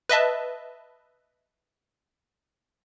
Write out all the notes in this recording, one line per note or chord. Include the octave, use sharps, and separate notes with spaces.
B4 D#5 E5 A5